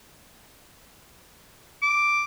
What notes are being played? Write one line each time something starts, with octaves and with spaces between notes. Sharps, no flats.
D6